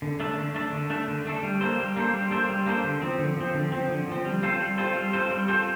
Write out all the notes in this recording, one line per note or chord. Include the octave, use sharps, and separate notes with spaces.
D3
A3 D4 A4
D3
A3 D4 A4
D3
A3 D4 A4
D3
A3 D4 A4
G3
A#3 D4 A4 C5
G3
A#3 D4 A4 C5
G3
A#3 D4 A4 C5
G3
A#3 D4 A4 C5
D3
F3 C4
D3
F3 C4
D3
F3 C4
D3
F3 C4
G3
C4 F4 A4 C5
G3
C4 F4 A4 C5
G3
C4 F4 A4 C5
G3
C4 F4 A4 C5